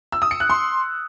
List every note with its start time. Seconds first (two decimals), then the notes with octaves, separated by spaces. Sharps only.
0.12 E6
0.22 D#6
0.31 C#7
0.40 F#6
0.50 C6